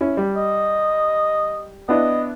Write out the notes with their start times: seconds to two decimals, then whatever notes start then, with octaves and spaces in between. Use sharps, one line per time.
0.01 C#4 E4
0.17 G3
0.36 D#5
1.89 B3 D4 E4 D#5